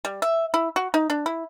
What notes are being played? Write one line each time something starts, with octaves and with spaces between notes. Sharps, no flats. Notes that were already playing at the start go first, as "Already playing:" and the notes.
G3
E5
E4
F#4
D#4
D4
E4